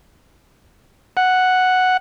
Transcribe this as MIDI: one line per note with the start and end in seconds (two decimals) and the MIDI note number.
1.17 1.97 78